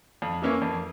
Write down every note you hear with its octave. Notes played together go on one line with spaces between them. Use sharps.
F2
E3 A#3 C#4 E4
F2